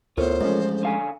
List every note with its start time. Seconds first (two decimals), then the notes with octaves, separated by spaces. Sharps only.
0.18 D2 A2 B3 F4 A#4 C5 C#5
0.41 A1 F2 G#2 G#3 A3 C#4
0.83 D3 F5 G#5